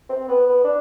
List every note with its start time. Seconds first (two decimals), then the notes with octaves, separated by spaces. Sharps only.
0.09 C4
0.28 B3
0.46 B3
0.64 D4